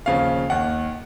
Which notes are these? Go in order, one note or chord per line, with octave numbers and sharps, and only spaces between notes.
D#2 C#3 F3 F5
D#2 D#3 F#5